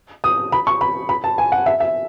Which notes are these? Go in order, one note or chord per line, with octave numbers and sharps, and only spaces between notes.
D#6
B5
C#6
B5
B5
A5
G#5
F#5
E5
E5